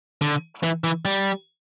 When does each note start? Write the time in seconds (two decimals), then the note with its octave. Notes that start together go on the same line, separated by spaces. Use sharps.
0.21 D3
0.63 E3
0.84 E3
1.05 G3